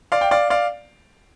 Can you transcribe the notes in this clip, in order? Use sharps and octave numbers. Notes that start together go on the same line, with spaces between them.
D5 F5
G5
D5 F5
D5 F5